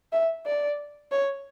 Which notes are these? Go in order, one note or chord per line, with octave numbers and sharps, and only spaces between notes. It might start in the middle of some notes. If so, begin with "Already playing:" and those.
E5
D5
C#5